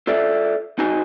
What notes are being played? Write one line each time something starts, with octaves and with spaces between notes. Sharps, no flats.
F4 A4 D5 E5
C4 D#4 F#4 D#5 G#5